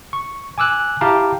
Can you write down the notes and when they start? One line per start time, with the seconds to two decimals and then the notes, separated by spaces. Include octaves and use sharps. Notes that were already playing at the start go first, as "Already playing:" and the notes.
0.13 C#6
0.58 G#5 D6 E6 F#6
1.01 E4 G4 F5 G5 A5 A#5